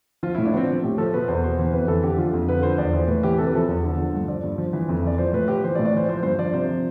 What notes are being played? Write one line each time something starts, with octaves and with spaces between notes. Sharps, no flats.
F3 F4
A2 E4
D4
F3 B3 C4
F3
A2 G4
F3 A4
B2 B4
E2 C5
B2 C5
E3 C5
F2 B4
E3 A4
D3 G4
F3 F4
F2
D3 B4
F3 C5
E2 D5
E3 C5
A2 B4
E3 G4
C3 A4
B4
F3 A4
E2
D3
F3
G2
F3 D5
G2
F3
E3
F2
E3 D5
F3 C5
A2 B4
F3 G4
E3 C5
D5
A2
D5
E3 C5
F3 C5
G2 C5
F3 D5
C3 C5
F3